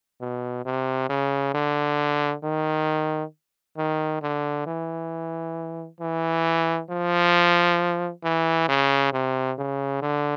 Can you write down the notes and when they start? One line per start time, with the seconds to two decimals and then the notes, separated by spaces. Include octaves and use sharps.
0.21 B2
0.65 C3
1.09 C#3
1.54 D3
2.44 D#3
3.77 D#3
4.22 D3
4.67 E3
6.01 E3
6.90 F3
8.24 E3
8.69 C#3
9.13 C3
9.58 C#3
10.02 D3